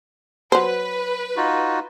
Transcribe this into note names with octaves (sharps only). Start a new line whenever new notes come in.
F#3 B4 C5
D#4 F4 F#4